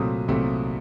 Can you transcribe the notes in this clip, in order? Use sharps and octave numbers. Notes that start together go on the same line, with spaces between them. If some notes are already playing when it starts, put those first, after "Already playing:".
Already playing: C2 A#2 F#3 A3 C4 D#6
C2 A#2 F#3 A3 C4